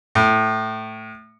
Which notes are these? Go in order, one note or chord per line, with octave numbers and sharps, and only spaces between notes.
A2